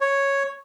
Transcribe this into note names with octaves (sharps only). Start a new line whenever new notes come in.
C#5